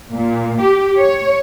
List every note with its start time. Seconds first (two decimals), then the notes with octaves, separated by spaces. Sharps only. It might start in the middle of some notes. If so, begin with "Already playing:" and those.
0.12 A#2
0.60 G4
0.97 C#5